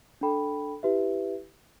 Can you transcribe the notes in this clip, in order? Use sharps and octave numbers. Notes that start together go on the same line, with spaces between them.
D4 A4 G5 B5
E4 G4 B4 E5